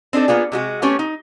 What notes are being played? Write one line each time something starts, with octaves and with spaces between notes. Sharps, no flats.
C4 D4 D#4 A4
A#3 B3 F4 G#4
C3 G#3 F#4
A3 B3 C#4 G4 C#5
D#4